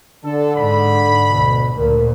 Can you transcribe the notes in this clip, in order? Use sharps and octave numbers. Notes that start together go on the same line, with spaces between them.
D3 A4
G#2 B5
D2 B2
D2 A#2 A#4